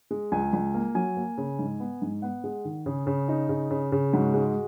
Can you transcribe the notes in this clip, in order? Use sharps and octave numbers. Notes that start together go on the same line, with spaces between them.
G#3
C#2 G#5
C#2
A#3
F#3 G#5
A#3
C#3
G#2
B3
G#2
B3 F#5
G#3
D#3
C#3 G#4
C#3
D#4
C#3
C#3
C#3
G#2 F#4
G#3